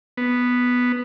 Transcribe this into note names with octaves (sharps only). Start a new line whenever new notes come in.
B3